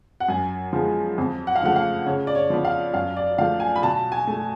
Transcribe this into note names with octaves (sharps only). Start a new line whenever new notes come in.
F#5
F#2 G#5
F3 G#3 B3
F2
F#5
F5
C#3 F3 A3 F#5
F5
C#3 C#5
D5
C#5
F3 B3
F5
F#2 F5
D5
F3 A3 F5
G#5
B5
B2 A5
G#5
A3